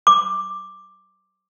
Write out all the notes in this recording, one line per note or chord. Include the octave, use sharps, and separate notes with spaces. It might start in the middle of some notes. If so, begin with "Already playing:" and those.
D6